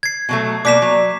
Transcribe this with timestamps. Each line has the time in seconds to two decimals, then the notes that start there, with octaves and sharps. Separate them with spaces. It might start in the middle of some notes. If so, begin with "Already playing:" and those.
0.03 G#6 C7
0.29 B2 F#3 A3
0.65 B2 G3 A#3 D5 D6 B6 E7
0.82 F#3